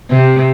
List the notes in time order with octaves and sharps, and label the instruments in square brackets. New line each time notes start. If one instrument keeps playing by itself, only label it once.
[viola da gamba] C3